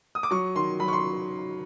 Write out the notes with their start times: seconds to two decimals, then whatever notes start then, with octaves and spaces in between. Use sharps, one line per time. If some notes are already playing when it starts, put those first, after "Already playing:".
0.15 D#6
0.23 D6
0.31 F#3 C#6
0.56 D#3 C6
0.80 F#3 B5
0.88 C#6
0.93 C6